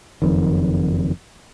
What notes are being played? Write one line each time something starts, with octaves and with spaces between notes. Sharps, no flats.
F#1 F2 D#3